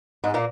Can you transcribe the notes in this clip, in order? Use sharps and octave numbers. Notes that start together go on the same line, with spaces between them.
G#2 G#3
A#2 A#3